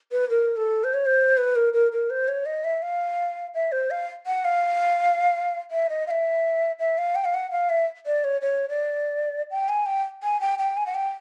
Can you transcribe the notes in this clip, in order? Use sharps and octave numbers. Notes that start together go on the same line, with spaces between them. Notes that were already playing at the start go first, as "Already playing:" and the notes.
B4
A#4
A4
C5
C#5
C5
B4
A#4
A#4
A#4
C5
C#5
D#5
E5
F5
E5
C5
F5
F#5
F5
E5
D#5
F5
E5
E5
F5
G5
F5
F#5
F5
E5
D5
C#5
C#5
D5
G5
G#5
G5
G#5
G5
G5
G#5
F#5
G5